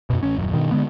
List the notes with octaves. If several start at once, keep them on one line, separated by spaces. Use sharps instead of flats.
F#2 B2
A1 C#4
D#1 F#2
G2 B2 D#3
D3 G#3 B3